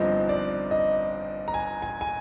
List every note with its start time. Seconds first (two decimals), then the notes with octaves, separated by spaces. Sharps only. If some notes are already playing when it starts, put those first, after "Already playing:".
Already playing: G1 G2 F3 C4 D#4 D#5
0.29 D5
0.71 D#5
1.48 A#5
1.54 G#5
1.82 G#5
2.01 G#5